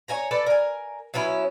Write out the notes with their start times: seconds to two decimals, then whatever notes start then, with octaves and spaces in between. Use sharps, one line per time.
0.08 C#5 D#5 G#5 A#5
0.31 A4 B4 D5
0.46 A#4 G#5
1.14 F#3 B3 C#4 E4